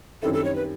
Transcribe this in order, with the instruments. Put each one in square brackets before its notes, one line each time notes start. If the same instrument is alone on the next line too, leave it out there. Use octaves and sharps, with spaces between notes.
[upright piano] F#2 D#3 G3 C4 E4 [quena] A4
[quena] A4
C#5
B4